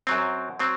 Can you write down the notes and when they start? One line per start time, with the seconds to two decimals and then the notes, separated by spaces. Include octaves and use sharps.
0.07 F#2 F#3 C4
0.59 F#3 C4